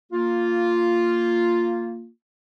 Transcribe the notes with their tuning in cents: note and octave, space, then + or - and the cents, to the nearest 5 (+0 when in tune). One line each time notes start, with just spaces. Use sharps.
A#3 -15 F4 +0